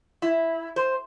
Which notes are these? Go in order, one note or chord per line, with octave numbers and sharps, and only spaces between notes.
E4
C5